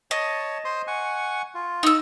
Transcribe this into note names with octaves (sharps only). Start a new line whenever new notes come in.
C#5 D#5 A5
C5 C6 D#6
F#5 G#5 C#6
F4
D#4 E6